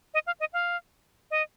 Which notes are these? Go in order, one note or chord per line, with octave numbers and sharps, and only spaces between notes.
D#5
F5
D#5
F5
D#5